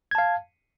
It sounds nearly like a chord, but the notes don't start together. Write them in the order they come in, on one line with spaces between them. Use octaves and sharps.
G#6 A5 F5